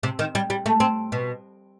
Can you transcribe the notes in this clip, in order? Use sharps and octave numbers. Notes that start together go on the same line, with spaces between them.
C3
D#3
G3
G3
A3
C4
B2